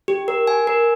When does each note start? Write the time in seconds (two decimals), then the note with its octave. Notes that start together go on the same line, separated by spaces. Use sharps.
0.08 G4
0.28 A#4
0.47 G#5
0.67 A#4